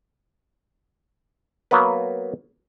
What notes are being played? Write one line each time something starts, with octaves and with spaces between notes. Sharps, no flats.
F#3 A#3 B3 B4